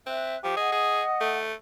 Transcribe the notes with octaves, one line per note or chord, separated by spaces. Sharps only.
C4 E5 F#6
F3 G4
G#4 D#5 F#5
G#4
A3